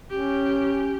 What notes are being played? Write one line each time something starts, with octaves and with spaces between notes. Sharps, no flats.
C#4 G4